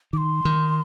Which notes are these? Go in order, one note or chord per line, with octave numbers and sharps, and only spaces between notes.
D#3 C6 D6
D#3